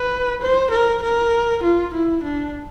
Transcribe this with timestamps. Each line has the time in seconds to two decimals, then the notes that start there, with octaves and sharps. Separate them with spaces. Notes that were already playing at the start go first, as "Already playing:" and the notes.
Already playing: B4
0.42 C5
0.71 A#4
1.03 A#4
1.63 F4
1.94 E4
2.24 D4